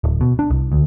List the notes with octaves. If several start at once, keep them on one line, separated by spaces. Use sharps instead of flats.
D1
B2
D4
C2
D2